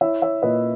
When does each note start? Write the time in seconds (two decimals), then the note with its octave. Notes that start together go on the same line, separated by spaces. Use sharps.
0.01 E4 C#5 E5
0.22 C#5 E5
0.42 A#2 B4 D#5